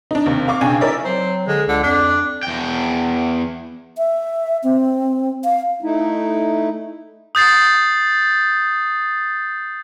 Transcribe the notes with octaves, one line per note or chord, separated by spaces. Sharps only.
D4 D#4
D#2 C3
F5 C#6 D6
B1 C#3 D4 G5 G#5
D#4 E4 A#4 C#5 D5 E5
F#3 C4
D3 G#3
C#2 D3
F2 D4
E2 G5
E5
C4
F5
A3 D#4 E4
D#6 G6 A6 C7